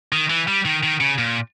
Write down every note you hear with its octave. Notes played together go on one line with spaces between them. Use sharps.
D#3
E3
G3
D#3
D#3
C#3
A#2